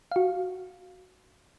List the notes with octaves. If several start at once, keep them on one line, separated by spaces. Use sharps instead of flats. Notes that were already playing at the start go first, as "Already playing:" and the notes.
F#4 F5